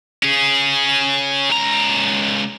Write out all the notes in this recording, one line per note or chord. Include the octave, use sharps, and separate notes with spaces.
C#4 G#4
C#2 A#5